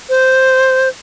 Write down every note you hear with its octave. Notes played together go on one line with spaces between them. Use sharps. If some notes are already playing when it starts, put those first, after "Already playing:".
C5